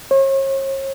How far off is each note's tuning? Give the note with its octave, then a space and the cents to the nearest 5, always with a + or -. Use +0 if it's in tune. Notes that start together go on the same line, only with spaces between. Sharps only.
C#5 -40